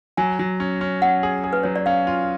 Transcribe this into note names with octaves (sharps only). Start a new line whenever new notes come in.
F#3 G#5
F#3
C#4
C#4
C#4 F#5
G#4
G#4
B4
F#3 C#5
D5
C#4 F5
F4